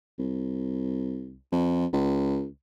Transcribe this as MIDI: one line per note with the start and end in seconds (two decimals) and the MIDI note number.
0.19 1.37 36
1.52 1.86 41
1.93 2.47 37